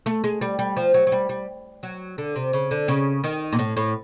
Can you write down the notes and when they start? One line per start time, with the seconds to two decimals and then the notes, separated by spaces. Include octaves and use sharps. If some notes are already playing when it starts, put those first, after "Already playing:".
0.06 A3
0.24 G#3
0.41 G3
0.59 G3
0.77 F3
0.94 F#3
1.07 F#3
1.12 G3
1.29 G3
1.83 F#3
2.18 D3
2.36 C3
2.53 C#3
2.71 D3
2.88 C#3
3.24 D#3
3.53 A#2
3.59 A2
3.77 A2